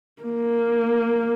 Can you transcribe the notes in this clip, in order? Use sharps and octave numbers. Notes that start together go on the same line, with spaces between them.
A#3